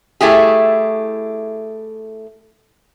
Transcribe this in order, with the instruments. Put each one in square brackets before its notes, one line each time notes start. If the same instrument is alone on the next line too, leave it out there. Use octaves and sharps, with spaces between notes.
[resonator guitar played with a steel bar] A3 E4 G4 G#4